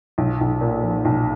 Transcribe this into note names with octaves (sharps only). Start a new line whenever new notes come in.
B1
B1
A#2
F3
B1